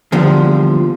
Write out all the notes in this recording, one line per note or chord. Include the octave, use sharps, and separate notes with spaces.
E2 A#2 D3 F3 G3